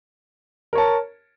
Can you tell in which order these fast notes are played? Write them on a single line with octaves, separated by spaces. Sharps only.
A#4 C#5 A5